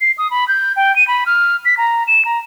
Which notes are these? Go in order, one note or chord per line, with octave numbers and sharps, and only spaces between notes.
C7
D#6
B5
G6
G5
D#7
B5
F6
B6
A#5
E7
A#5